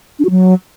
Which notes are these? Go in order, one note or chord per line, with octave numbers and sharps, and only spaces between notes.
D4
F#4
F#3